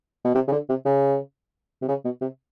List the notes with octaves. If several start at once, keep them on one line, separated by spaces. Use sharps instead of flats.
B2
C3
C#3
D3
C3
C#3
C3
C#3
B2
C3